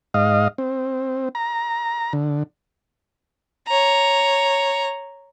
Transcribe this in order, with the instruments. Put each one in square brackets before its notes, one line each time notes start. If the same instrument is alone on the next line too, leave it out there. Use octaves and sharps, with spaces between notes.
[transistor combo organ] G#2 D#5 F5
C4
A#5
D3
[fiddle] C#5 A#5